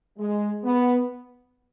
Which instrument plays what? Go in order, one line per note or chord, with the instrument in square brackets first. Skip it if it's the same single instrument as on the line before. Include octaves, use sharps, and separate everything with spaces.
[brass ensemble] G#3
B3